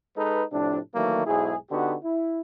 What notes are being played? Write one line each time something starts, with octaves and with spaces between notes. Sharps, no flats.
G#3 D#4 A4 B4
A2 C3 F3 D4
D#3 E3 F#3 A3 A#3
B1 G#2 E4 G#4
D3 B3 D#4 F#4 G4
E4